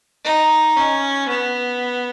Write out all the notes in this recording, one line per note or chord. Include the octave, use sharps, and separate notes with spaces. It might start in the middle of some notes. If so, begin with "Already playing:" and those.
D#4
C#4
B3